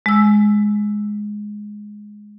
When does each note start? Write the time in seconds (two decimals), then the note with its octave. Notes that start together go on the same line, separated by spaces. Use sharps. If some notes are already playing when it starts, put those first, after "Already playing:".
0.06 G#3 E6